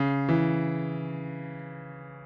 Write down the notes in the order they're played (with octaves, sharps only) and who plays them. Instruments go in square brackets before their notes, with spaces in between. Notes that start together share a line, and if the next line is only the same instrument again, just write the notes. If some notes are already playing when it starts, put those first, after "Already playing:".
Already playing: [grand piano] C#3
E3